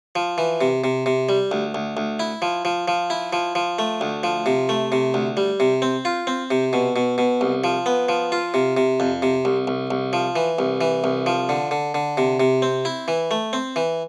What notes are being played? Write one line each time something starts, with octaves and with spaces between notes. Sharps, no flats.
F3
E3
C3
C3
C3
G3
D2
D2
D2
E4
F3
F3
F3
E4
F3
F3
A3
D2
F3
C3
A3
C3
D2
G3
C3
C4
F4
C4
C3
B2
B2
B2
C2
F3
B3
F3
F4
C3
C3
F2
C3
C2
C2
C2
F3
E3
C2
E3
C2
F3
D3
D3
D3
C3
C3
C4
E4
E3
A3
C4
E3